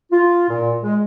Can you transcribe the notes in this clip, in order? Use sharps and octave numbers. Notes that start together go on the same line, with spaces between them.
F4
A#2
G#3